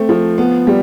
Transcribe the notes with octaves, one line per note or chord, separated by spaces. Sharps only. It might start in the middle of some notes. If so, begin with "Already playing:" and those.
Already playing: A3 C4
F3
B3
G3